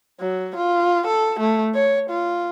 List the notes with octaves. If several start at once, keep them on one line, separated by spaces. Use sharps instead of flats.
F#3
F4
A4
A3
C#5
F4